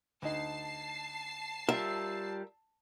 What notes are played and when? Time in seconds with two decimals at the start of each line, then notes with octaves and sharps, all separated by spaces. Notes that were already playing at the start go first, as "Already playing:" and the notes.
0.22 D2 D#4 A5 C7
1.69 G3 F4 A#4 E5